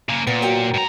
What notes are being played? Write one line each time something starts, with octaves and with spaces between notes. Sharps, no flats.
C#3 A#3
A#2 B3
F#3 A#4 G5
G#2 A#5